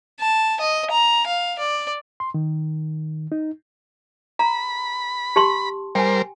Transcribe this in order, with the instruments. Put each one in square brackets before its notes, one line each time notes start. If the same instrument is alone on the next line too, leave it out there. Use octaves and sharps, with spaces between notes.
[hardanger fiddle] A5
D#5
A#5
F5
D5
[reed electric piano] C6
D#3
D#4
[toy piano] A#5 [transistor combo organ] B5
[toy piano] G4 A5 C6
[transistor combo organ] G3 A#4 C5 [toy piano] G5 G#5